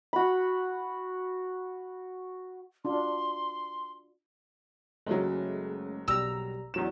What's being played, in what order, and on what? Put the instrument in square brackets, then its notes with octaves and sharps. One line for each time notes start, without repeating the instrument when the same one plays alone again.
[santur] F#4 B5
[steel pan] D4 F4 F#4 [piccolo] C6
[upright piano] F#1 F#3 [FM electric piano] G#3 A3 C#4
[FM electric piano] B1 G3 A#5 [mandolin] E6
[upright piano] E2 F#3 E7